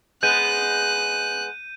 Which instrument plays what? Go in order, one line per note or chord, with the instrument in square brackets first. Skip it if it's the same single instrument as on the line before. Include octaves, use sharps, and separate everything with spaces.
[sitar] G#3 B3 [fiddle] F#6 [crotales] G6 D#7